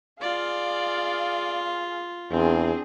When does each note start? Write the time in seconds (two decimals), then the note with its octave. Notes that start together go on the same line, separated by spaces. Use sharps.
0.22 F4 G#4 D5 F5
2.31 E2 C4 D4 G#4